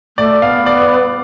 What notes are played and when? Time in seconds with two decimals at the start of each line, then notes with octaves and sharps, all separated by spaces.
0.18 A3 D5
0.42 B3 F5
0.66 D5